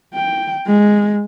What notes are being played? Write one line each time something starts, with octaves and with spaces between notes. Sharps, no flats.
G5
G#3